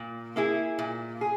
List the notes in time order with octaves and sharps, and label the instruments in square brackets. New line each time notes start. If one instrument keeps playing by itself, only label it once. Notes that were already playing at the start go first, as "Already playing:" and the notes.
Already playing: [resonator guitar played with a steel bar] A#2
A#3 E4 G#4
A#2
G#4